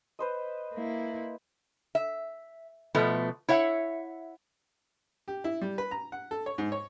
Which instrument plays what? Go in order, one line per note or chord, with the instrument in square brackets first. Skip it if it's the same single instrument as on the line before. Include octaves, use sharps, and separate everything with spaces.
[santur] B4 C5 D#5
[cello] A#3 E4
[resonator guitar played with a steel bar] E5
B2 F3 A3 B3
E4 C#5 E5 F#5
[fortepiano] G4
E4
G3
B4
A#5
F#5
A4
C#5
G#2
C#5